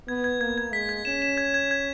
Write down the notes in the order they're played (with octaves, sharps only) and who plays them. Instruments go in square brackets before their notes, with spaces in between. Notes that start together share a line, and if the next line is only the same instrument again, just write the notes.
[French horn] B3 [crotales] G#6
[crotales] G#6
[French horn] A#3 [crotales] G#6
[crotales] G#6
[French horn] G#3 [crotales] B6
[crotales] G#6
[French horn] C#4 [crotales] E7
[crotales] E7
G#6
G#6
G#6